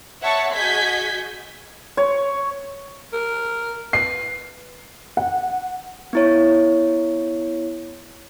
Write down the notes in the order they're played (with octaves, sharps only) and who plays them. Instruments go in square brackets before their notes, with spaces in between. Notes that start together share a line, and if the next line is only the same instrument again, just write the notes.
[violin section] C#5 E5 F#5 A5 C#6
F#4 G#4 D#5 G6 G#6 B6
[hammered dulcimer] C#5
[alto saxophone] A#4
[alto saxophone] B4 [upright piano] C7
[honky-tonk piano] F#5
[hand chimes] B3 E4 C#5